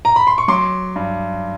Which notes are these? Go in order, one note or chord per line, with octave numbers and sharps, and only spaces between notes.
A#5
B5
C6
C#6
F#3 C6 D6
G2